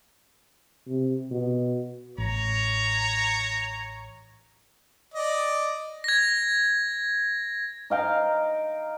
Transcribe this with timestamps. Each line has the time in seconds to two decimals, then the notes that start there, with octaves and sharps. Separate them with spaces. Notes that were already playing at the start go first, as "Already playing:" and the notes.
0.87 C3
1.31 B2
2.18 A1 C#5 A#5
5.14 D5 D#5
6.04 G#6 A#6
7.90 D#4 F5 G5 A#5